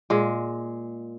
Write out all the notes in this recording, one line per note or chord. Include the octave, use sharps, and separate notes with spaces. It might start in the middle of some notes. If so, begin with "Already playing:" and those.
A#2 G#3